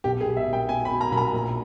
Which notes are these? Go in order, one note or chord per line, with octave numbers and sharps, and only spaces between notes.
B1 G4
G#4
B1
E5
B1
G5
B2 G#5
B5
B2
A#5
B1 B5
A#5
A#1